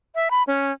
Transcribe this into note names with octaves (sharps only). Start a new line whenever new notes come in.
E5
B5
C#4